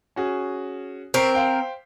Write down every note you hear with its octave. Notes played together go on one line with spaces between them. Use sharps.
C#4 F#4 G#4
C4 A#4 C#6 B6 C7
C5 F5 G5